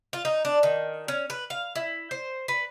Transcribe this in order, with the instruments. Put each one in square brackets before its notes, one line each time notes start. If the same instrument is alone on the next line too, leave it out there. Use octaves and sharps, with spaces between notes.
[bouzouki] F4
D#4
D4
D#3
C#4
B4
F5
E4
C5
B4